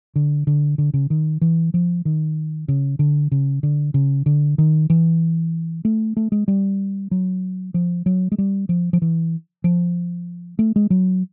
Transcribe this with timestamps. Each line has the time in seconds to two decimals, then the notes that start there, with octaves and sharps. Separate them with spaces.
0.16 D3
0.47 D3
0.78 D3
0.94 C#3
1.10 D#3
1.41 E3
1.74 F3
2.05 D#3
2.68 C#3
2.99 D3
3.32 C#3
3.63 D3
3.94 C#3
4.26 D3
4.58 D#3
4.90 E3
5.85 A3
6.17 A3
6.32 G#3
6.48 G3
7.11 F#3
7.74 F3
8.06 F#3
8.32 G#3
8.38 G3
8.69 F3
8.93 F3
9.02 E3
9.64 F3
10.59 A3
10.76 G#3
10.90 F#3